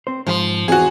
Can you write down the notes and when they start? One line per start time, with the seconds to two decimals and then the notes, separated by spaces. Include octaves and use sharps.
0.07 C4 C5
0.27 G#2 F3 G#4 C6
0.68 E2 E3 C4 F#4 G#4